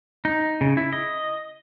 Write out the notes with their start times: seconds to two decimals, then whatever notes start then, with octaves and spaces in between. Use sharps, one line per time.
0.25 D#4
0.61 C#3
0.77 E4
0.93 D#5